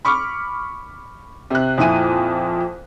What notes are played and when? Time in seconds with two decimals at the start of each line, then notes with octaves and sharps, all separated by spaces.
0.05 B5 C#6 D6 F6
1.50 C3 F#6
1.78 F2 A#2 E4 G#5 D#7